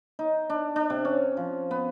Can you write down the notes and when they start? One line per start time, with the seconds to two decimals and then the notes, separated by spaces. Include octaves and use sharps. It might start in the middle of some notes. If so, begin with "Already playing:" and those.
0.19 D#4
0.50 D4
0.76 D4
0.90 C3
1.05 C#4
1.37 F3
1.71 B3